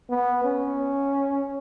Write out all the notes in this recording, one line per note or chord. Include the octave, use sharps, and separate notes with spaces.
B3
C#4